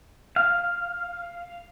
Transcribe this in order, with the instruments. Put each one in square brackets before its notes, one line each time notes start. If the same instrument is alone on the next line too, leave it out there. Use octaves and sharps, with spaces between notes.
[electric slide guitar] F5